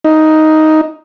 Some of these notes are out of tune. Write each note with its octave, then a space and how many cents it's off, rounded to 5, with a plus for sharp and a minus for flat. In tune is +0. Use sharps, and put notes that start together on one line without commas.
D#4 +5